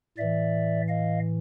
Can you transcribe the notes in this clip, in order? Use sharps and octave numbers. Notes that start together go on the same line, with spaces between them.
A2 E3 D5 E5
D#5 F5